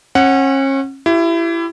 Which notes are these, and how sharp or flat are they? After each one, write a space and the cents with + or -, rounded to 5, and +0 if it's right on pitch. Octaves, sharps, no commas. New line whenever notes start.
C#4 -35 F#5 +0
E4 +25 G4 -20